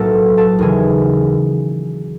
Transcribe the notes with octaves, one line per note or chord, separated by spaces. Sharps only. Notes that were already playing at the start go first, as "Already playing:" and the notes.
Already playing: B1 A2 F#3 A#3 A4 A5
A4 A5
D#2 C#3 E3 G#4 G#5